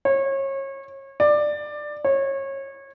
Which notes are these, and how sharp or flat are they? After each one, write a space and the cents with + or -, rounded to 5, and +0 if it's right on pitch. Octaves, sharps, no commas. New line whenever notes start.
C#5 -30
D5 +15
C#5 -25